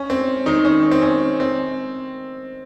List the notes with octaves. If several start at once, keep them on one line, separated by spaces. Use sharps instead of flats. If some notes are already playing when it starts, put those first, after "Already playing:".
Already playing: C#4
C4
D#3 D#4
C#4
C4
C#4
C4